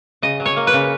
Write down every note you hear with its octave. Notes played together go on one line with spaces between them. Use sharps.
C#3 D#5
F#3
C#5
A#3
B4
C#3